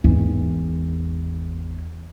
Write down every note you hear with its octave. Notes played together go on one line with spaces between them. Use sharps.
G#1 E2